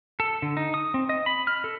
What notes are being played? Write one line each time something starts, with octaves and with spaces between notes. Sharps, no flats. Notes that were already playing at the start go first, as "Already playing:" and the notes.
A4
D3
D#4
D#6
C4
D#5
B5
F6
A4